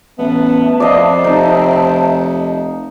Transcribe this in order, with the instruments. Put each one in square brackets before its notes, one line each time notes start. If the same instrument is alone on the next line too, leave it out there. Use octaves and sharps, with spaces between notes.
[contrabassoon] A1 [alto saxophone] B3 [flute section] E5 A5
[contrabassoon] F2 [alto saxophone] C4 [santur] D5 D#5 F5
[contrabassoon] F1 [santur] D#4